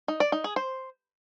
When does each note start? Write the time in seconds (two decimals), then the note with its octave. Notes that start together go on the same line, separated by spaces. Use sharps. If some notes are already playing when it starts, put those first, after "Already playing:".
0.08 D#4
0.20 D5
0.32 D#4
0.44 G#4
0.56 C5